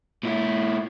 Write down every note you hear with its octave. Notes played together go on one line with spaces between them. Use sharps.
A#2 E4